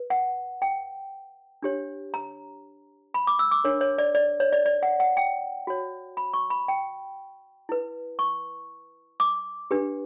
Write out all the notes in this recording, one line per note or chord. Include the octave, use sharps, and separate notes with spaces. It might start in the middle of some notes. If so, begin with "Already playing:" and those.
Already playing: B4
F#5
G5
D4 G4 C#5
A#5
B5
D6
E6
D6
D4 A#4 C#5
C#5
D5
D5
C#5
D5
D5
F#5
F#5
G5
F#4 C#5
B5
C#6
B5
G5
E4 B4
C#6
D6
D4 G4 B4